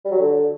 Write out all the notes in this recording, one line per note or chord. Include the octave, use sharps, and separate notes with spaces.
G3
F#3
D3